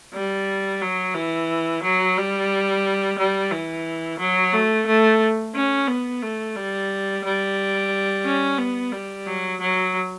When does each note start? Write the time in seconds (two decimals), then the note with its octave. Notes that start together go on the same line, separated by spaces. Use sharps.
0.14 G3
0.81 F#3
1.15 E3
1.83 F#3
2.17 G3
3.18 G3
3.52 E3
4.19 F#3
4.53 A3
4.86 A3
5.55 C#4
5.88 B3
6.22 A3
6.56 G3
7.24 G3
8.26 C#4
8.58 B3
8.92 G3
9.26 F#3
9.60 F#3